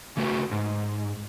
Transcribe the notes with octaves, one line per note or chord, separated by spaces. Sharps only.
C#3 A3 F#4 B4
G#2